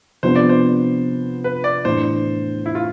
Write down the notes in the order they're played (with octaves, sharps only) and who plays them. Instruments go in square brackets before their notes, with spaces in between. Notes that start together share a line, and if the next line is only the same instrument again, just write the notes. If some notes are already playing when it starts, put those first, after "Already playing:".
[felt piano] C3 F3 B3 D4 [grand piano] C5
[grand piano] D5
C5
B4
D5
[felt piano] A2 E3 A3 D4 [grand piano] C5
[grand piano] E4
F4